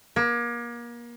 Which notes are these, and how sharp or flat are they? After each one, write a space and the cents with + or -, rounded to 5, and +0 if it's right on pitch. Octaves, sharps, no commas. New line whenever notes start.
A#3 +35